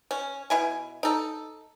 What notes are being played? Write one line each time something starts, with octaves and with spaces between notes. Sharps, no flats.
C#4
B2 E4 G#5
D#4 A4